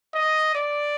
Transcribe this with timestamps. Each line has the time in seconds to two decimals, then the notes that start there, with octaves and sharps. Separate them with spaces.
0.14 D#5
0.55 D5